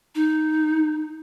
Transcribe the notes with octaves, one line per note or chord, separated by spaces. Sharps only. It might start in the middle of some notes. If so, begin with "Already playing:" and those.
D#4